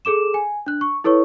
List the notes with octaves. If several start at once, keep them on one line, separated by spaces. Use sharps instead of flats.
G#4 A4 D6 E7
G#5
D4 F#6
C#6
E4 A4 B4 C#5 C#6